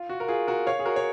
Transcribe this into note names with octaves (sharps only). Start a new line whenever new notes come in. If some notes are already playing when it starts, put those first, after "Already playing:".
Already playing: F4
F#4
A#4
F4 G#4
F#4 A#4
C#5 F5
G#4
F#4 A#4
C#5